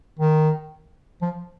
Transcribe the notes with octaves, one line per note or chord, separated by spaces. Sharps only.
D#3
F3